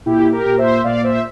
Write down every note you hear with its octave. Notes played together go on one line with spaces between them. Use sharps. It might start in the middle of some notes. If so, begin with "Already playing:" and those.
A#2 E4 G4
G4 A#4
A#2
C5 E5
A#2 D5 F5
C5 E5